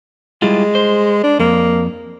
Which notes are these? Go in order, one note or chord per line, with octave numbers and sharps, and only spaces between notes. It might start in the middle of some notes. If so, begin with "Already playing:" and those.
G3 G#3 E4 F4
C5
D4
F2 A#3